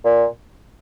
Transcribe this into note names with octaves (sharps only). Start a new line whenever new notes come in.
A#2